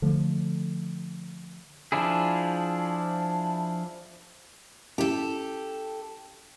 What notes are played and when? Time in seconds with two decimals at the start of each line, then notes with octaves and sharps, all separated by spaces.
0.02 D3 F3 A3
1.92 F3 D4 E4 G#4
4.98 C#4 E4 G4 A4